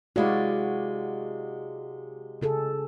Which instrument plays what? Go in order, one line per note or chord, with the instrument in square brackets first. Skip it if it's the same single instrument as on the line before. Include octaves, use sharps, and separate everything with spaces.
[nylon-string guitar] C3 G#3 E4 [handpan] F#4 D5 F5
[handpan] C#3 G#4 A4